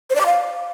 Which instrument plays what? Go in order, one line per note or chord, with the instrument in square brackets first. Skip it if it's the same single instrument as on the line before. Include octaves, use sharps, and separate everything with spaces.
[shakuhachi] C5
D5
D6
F5